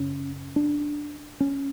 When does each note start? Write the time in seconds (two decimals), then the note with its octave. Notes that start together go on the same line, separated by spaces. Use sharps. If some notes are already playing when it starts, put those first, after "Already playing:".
Already playing: F#2 C#3 C#4
0.56 D4
1.40 C#4